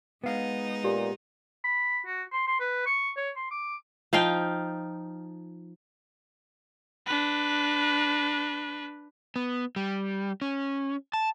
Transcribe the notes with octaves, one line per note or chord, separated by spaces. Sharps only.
G#3 B3 D#4 F5
A#2 G4
B5
F#4
C6
C6
B4
C#6
C#5
C6
D6
F3 D#4 F5 G5
D4 B4
B3
G3
C#4
A5